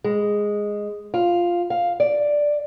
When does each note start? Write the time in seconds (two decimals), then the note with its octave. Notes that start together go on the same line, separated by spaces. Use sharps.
0.04 G#3
1.14 F4
1.70 F5
2.00 D5